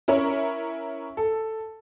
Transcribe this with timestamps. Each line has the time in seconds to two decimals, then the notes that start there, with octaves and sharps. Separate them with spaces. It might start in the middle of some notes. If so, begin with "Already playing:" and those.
0.08 C#4 E4 A#4 C#5
1.17 A4